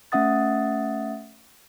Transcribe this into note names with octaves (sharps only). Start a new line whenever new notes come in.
A3 C#4 E5 F#5 D#6 A6